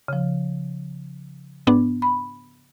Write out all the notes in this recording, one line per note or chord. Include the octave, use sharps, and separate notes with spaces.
C#3 F3
G#2 B3 D4
B5